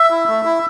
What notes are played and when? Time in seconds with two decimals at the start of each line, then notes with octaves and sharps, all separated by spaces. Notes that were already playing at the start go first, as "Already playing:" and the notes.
Already playing: E5
0.10 E4
0.28 A3
0.45 E4